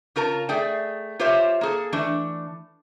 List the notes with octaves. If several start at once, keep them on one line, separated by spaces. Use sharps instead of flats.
C#3 F4 A#4 A5
A3 G#4 D5 G5
F4 G4 C5 C#5 E5
A#3 G#4 A4
E3 A3 D4